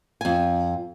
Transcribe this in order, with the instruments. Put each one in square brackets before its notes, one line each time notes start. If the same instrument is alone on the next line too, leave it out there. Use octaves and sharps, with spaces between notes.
[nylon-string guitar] F2 G#5